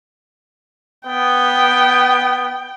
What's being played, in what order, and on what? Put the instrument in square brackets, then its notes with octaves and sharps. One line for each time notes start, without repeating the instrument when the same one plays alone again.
[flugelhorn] B3 [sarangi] G5